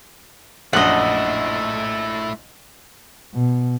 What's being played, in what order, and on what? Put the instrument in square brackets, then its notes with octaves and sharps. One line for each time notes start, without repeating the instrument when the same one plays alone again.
[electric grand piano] A#1 F#2 D4 [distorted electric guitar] A3 E4 [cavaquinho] D#5 F#5
[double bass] B2